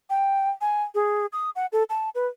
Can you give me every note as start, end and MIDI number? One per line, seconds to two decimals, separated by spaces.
0.10 0.50 79
0.61 0.83 80
0.95 1.26 68
1.33 1.50 87
1.56 1.66 78
1.73 1.83 69
1.90 2.09 81
2.15 2.27 71